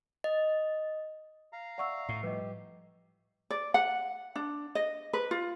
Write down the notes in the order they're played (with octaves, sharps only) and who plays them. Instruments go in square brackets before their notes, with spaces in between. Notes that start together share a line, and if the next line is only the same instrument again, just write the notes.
[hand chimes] D#5
[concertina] F5 A#5
[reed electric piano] D5 E5 [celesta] F#5 C#6 E6
[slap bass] A2 [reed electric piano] C#6 [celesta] C7
[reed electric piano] F3 G3 [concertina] G4 [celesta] B4 D#5
[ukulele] D5
F#5
D4
D#5
B4
F4